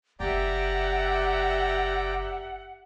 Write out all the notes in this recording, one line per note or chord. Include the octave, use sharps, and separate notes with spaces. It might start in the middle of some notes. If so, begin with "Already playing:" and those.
F#1 G4 D5 E5 F#5 G5 A#5